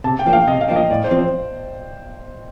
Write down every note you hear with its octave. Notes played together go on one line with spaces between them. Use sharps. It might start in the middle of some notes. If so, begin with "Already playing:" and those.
C3 A5
G5
F3 A#3 D4
F5
C3 D#5
F5
F3 A#3 D4
D#5
A2 D5
C5
F3 C4
C5